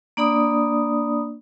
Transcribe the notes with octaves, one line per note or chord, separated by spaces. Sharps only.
A#3 D4 D5 B5 D#6